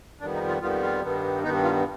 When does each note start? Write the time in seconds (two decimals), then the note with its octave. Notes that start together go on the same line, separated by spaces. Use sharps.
0.21 F2 D#3 G3 B3 D4
0.34 D#4
0.48 F4
0.61 F2 D#3 G3 B3 F4
0.82 F4
1.03 G2 D#3 B3
1.44 G2 D#3 B3 D#4
1.64 F4